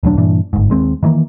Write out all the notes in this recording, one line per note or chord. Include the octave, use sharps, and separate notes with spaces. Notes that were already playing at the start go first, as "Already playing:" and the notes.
E1 D2 F#3 D4
G2 A#2 E3 D4
G1 G#2
D#2 G#3 C4
D#3 E3 A3 A#3